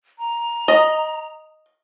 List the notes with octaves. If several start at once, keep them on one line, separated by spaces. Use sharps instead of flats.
A#5
D#5